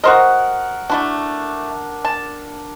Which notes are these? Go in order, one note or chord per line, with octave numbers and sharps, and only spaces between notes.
F#4 A#4 C5 D#5 F#5
A3 D4 E4 F#4
A5